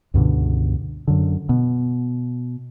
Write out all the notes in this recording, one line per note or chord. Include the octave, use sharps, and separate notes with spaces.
C#2 G2 B2 D3
F#2 D3
B2